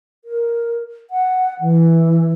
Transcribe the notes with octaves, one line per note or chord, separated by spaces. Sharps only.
A#4
F#5
E3